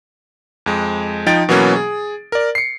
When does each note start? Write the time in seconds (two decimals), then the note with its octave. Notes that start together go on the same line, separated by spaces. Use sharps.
0.66 F2 G#3
1.26 F3 D#4 G5 A6 D7
1.49 B2 E3 F#3 A#3 C#4
1.76 G#4
2.32 A#4 D5
2.55 C7 C#7